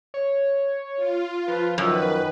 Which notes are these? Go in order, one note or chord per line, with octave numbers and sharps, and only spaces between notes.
C#5
F4
F3 B4
F#2 D#3 B4